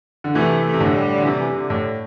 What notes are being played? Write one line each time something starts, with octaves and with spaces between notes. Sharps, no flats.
D3
C3 E3 A3
A3
C3
A2 D3
G3
D3
C3 E3
C3
D3
A2